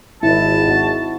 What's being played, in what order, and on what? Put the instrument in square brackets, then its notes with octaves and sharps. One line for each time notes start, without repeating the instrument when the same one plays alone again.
[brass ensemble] G#1 [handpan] E4 [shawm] A5
[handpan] F#4